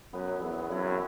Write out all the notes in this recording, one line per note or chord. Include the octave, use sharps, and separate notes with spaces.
F#2 B3
F#3
E2 E4
B3
F#2 E4
C4